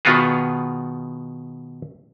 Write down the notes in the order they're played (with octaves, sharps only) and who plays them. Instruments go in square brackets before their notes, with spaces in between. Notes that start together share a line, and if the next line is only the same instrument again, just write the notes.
[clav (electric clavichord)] B2 D#3 B3 F4 F#4 G#4